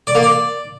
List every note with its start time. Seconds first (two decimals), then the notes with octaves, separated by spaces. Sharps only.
0.07 D5
0.15 A#3
0.23 D5